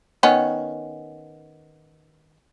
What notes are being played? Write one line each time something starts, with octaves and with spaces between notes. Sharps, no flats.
D#3 B3 C#4